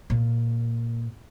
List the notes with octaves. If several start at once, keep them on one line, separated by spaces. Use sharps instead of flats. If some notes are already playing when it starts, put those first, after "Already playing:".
A#2